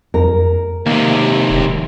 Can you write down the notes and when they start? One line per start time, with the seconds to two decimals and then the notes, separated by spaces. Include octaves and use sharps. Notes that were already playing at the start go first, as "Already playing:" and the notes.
0.14 F2 A#4
0.86 D#2 C3 A#3
1.50 E1